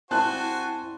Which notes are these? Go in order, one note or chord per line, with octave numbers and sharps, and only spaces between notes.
C4 E4 F#4 C5 G#5 A5 F#6